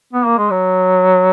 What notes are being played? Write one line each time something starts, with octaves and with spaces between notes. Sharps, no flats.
B3
A#3
G#3
F#3